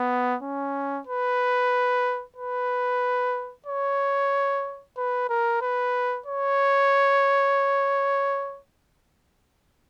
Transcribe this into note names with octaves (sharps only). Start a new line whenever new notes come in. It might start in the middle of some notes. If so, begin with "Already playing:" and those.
Already playing: B3
C#4
B4
B4
C#5
B4
A#4
B4
C#5